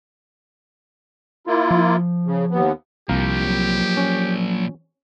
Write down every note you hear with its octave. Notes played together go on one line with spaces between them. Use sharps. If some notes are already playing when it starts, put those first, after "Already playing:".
A#3 E4 F4
F3
C#3
D#2 B3
C2 F3 A#3 G4 F5 A#5
F#3
C#4